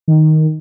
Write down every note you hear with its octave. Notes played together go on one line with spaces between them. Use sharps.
D#3